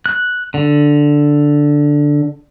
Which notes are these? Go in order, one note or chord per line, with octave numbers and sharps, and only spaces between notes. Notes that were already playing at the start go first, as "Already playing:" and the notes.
F#6
D3